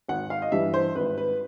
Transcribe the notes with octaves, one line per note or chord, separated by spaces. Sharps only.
G#1 F#5
F5
D#5
G2 E3 G3 E5
C5
G#1 B4
B4